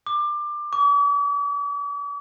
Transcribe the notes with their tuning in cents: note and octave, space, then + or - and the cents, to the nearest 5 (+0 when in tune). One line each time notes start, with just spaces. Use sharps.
D6 +20
D6 -45